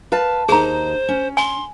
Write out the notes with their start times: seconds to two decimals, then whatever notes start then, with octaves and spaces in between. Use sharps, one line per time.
0.12 B4 F5 A5
0.49 D#2 D#4 G#4 C5 A#5
1.08 C#4
1.37 G#5 C6